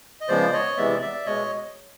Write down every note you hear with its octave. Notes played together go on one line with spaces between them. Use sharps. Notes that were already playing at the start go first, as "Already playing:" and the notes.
D#5
C#3 F3 G#3 B3 C5 D5
C#5 D#5
C3 E3 G#3 B3 D5 E5
D5 E5
B2 G#3 C#5 D#5